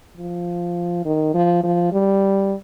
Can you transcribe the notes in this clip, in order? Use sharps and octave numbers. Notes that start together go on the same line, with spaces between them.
F3
D#3
F3
F3
G3